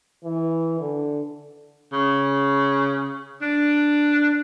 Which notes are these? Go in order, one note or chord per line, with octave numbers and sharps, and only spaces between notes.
E3
D3
C#3
D4